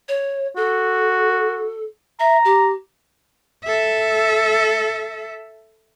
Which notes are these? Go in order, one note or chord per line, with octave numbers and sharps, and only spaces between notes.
C#5
F#4 A4
E5 A#5
G4
A4 E5